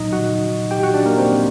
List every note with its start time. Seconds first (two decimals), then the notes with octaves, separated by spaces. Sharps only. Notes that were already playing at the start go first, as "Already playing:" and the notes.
Already playing: A#2 F#3 D#4 D#5
0.13 F#4 F#5
0.71 G4 G5
0.83 F#4 F#5
0.94 D4 D5
1.06 A#3 A#4
1.18 C4 C5